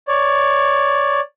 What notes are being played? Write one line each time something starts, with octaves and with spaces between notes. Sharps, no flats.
C#5 D5